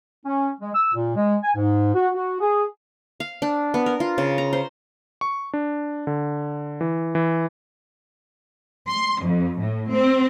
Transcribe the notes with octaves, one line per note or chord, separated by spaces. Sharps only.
C#4
G#3
E6
A#2
G#3
G#5
G#2
F#4
F#4
G#4
F5
D4
B3
A#4
F4
C#3
A#5
C5
C#6
D4
D3
E3
E3
C6
F2
A2
C4